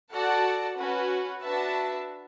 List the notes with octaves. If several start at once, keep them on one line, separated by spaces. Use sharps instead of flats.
F#4 A4 D5 F#5 A5
C#4 F#4 B4
D4 F#4 B4 E5 A5